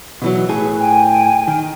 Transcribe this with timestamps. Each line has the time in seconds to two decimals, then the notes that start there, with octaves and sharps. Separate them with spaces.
0.22 B2 E3 F#3
0.49 A2 G#4 B4
0.80 G5 G#5
1.48 D#3